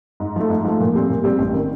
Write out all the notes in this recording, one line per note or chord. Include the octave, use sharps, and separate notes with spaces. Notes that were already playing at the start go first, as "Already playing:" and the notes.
G#2
F3 A3
G#2
F3 A3
A#2
G3 C4
A#2
G3 C4
A1
D#3